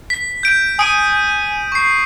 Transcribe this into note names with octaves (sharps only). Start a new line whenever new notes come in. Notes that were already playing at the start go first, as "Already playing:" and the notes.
B6
G6 D7
G#5 D#6 D7 D#7
C#6 C7